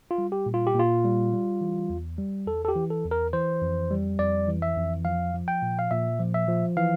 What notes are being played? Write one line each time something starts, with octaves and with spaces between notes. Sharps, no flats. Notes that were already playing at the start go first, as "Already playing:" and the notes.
F4
G3
G4
A#2
F4
G4
A#2 F4
G3
G3
E3
E2
G3
E2 A4
A4
G4
E3
A4
E2
A#4
E3 C5
F2
G3
F2 D5
E3
E5
F2
F3 F5
F3
G5
A#2
F5
A#2 E5
F3
E5
F3
E3 F5